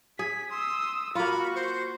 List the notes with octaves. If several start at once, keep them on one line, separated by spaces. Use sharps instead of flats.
G#4 B6
C6 D#6 E6
A#3 F4 F#4 B5 C#6
C5